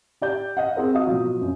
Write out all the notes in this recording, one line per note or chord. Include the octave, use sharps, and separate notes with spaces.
G4 D5 G6
D#5 F5 F#5
C4 G#4 A#4 C5
F#4 D#5 F5 D#6
B2 F3 F#3
F#2